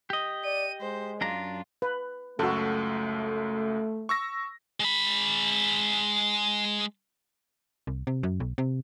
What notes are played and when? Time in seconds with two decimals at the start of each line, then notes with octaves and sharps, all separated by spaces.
0.10 G4 D#5
0.45 D5 D#7
0.81 G#3 C5
1.21 F#2 D4 F4 A#5
1.82 B4
2.39 C#2 F#2 A3 F#4 A4
4.09 C#6 E6 A#6
4.80 G#3 B5
7.87 C2
8.07 C3
8.23 F#2
8.40 B1
8.58 C3